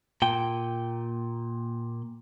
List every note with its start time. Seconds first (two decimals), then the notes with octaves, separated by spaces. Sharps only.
0.22 A#2 G5